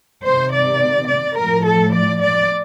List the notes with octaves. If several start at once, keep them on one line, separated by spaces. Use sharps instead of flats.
C3 D#3 C5
D5
D5
A2 F3 A#4
A4
D5
D5